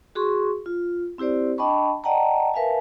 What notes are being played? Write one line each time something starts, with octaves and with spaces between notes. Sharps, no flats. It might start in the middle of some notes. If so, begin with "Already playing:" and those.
F#4 G#4 C6 C#6
F4
C4 E4 G4 C5 D5
D4 D#5 G5 A5 B5 C#6
D5 D#5 F#5 G5 A5 A#5
A#4 B4 E5 F5 G#5 A5